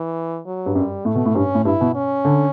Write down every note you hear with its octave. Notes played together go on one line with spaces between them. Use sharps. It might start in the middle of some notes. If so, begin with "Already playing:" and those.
Already playing: E3
F#3
G2
F#2 G3
A2 A3
B2
A2
G2 C#4
A2
G2 E4
B2
C#4
D3